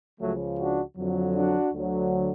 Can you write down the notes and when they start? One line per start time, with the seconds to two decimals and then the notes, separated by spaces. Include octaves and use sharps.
0.20 C#2 C#3 F3 F#3 A3
0.58 D4 F#4
0.96 F2 D3 F#3
1.35 D4 F#4
1.73 D2 D3 F#3